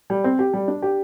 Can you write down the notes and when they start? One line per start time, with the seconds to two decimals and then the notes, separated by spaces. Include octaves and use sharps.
0.10 G3
0.24 C4
0.39 G4
0.53 G3
0.68 D4
0.82 G4